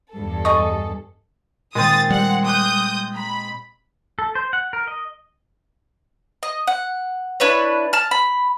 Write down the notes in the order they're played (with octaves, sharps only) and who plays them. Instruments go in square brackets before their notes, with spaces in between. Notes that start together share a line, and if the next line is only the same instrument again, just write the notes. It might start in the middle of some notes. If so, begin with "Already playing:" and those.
[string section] E2 G2 A4
[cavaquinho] G#4 D#5 D#6 [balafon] C#6
[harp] A#2 D#3 [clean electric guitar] G#3 C4 [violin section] D#6 A6
[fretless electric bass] G3 [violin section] F#5
[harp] D6 F#6 [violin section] D#6 G6
[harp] A#5 [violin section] B5
[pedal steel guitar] A4
C5
F#5
A#4
D#5
[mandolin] D#5
F#5
D4 E4 B4 C#5
A5 F6
B5